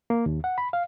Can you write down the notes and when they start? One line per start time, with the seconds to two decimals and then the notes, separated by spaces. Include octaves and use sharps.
0.10 A#3
0.26 D#2
0.44 F#5
0.58 B5
0.73 F5